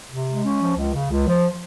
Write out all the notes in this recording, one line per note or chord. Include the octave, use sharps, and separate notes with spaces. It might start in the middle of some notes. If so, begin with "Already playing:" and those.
C3
G#3
C#4
F3
C#2
C#3
C#2
F3